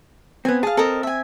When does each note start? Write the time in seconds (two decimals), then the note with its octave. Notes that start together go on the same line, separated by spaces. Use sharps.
0.45 B3 C4 G#5
0.63 G#4 F5 A5
0.77 C4 A4 A#4 D#5
1.03 E5 G#5